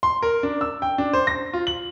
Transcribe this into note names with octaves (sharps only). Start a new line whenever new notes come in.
C6
A#4
D4
E6
G5
D4
C5
A#6
F4
F#7